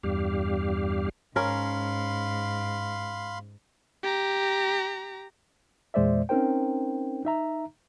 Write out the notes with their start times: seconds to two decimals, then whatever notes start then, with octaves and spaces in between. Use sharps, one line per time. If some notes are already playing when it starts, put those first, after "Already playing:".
0.03 E2 G2 G3 G4 F5
1.36 G#2 C#4 A#4 F5 B5 C6
4.03 G4 A#5
5.94 E2 A#2 G#3 C5 D5 E5
6.29 C4 C#4 D#4 A#4 C5 G5
7.25 D#4 E5 A#5